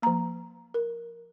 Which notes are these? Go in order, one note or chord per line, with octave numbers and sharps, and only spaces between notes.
F3 A#3 A#5
A#4